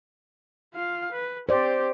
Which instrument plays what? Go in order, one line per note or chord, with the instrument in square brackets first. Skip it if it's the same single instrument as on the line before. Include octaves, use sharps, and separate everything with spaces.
[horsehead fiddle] F4 F5
B4
[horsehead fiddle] C4 G4 [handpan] C5 D5